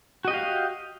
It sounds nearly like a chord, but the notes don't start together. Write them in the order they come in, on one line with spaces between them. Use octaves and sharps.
F#4 D#5 G4 F5